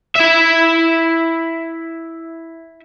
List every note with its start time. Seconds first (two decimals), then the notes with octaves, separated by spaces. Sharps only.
0.16 E4 E5